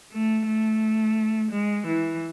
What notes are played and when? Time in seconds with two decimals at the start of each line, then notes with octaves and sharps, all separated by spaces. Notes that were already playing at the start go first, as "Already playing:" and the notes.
0.12 A3
0.46 A3
1.51 G#3
1.87 E3